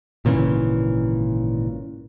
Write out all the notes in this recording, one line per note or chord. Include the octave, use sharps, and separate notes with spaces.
G#1 A#2 C#3 E3